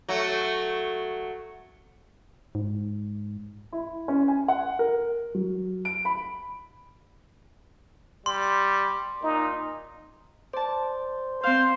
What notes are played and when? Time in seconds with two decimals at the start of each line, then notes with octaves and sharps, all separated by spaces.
0.09 F#3 A3
2.55 G#2
3.72 E4
4.08 C#4
4.28 G#5
4.48 F#5
4.79 A#4
5.35 F#3
5.85 D7
6.05 B5
8.26 G3 C6
9.23 A#2 D#4
10.53 C5 D5 A5
11.43 C4 C5 F5